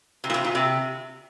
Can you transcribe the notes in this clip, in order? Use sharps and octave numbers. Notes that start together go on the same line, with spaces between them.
C3
A#2
C3
A#2
C3